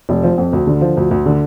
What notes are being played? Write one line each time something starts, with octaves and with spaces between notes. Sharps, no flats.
F1
F3
F2
D2
D3
F3
D2
D2
D3